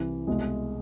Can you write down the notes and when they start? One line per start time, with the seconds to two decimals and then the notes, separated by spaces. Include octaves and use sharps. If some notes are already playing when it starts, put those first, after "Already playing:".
Already playing: C2 C3 E3
0.27 C2 B2 G#3